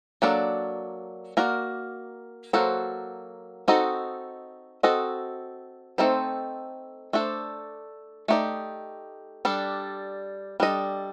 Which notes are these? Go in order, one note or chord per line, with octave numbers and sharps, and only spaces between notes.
F#3 A#3 D4 A4 D5
A#3 F#4 A#4 D5
F#3 A#3 F#4 A4 C5
C4 D#4 F#4 A4 D#5
C4 F#4 A4 D#5
A3 C4 D#4 A4 C5
A3 D4 A4 C5
A3 D#4 G4 D5
G3 D4 A4
G3 D4 A4 D#5